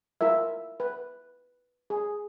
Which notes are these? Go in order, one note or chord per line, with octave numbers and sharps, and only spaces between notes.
E4 F4 A#4 E5
B4
G#4